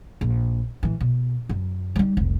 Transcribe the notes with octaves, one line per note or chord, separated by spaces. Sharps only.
A#1
A2 E3
B2
F#2
G3 D#4
F1 C2